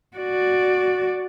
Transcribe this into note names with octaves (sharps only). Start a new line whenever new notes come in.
F#4 D5